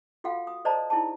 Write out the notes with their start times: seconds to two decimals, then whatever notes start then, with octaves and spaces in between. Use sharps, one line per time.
0.24 F4 F#4 A4 F5 F#5
0.47 D#6
0.65 A4 C5 D5 D#5 A5 A#5
0.90 D#4 E4 G#4 A5